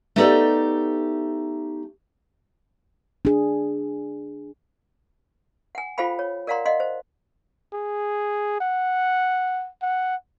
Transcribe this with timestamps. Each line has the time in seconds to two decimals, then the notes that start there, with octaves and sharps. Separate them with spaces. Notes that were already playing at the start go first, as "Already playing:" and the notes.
0.16 A3 B3 D#4 G4 A4 D5
3.25 D4 G#4
5.75 F#5 G#5
5.98 F4 A4 C5 F5 G5 B5
6.19 C#5
6.47 A#4 D5 F5 F#5 A#5 C6
6.66 D#5 F5 F#5 C6
6.80 C5
7.73 G#4
8.61 F#5
9.82 F#5